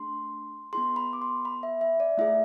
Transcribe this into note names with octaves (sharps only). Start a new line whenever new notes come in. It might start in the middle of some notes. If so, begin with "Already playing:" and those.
Already playing: A3 D4 G#4 C6
B3 E4 G#4 C6
B5
D6
C6
B5
E5
E5
D5
A3 E4 G#4 E5